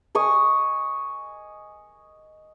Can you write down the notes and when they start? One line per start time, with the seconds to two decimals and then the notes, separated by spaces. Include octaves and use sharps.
0.15 D#5 G#5 C#6 D#6